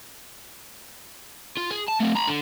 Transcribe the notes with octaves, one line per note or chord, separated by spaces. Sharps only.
F4
G#4
A5
A3 C4
A#5 B5
D3